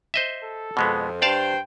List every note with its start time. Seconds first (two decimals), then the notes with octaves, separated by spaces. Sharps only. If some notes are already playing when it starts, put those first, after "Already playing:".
0.14 C5 D#5 E5
0.43 A4
0.77 F2 B2 G#3 B3
1.22 G2 C5 D5 F5 G5 A5